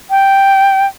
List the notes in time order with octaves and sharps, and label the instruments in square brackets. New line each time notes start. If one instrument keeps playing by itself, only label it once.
[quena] G5